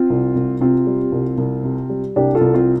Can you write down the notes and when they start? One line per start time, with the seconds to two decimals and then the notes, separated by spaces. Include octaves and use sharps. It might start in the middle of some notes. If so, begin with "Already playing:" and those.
Already playing: C4 F4
0.10 C2
0.36 C2
0.61 C3 C4 F4
0.86 G3
1.12 C2
1.38 C2
1.64 C3
1.89 G3
2.16 C2 D4 G4
2.35 F4 A4
2.41 C2
2.54 C4 F4